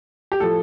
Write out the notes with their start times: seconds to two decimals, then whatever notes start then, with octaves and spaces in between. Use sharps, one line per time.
0.32 G4
0.40 A2 F3 A4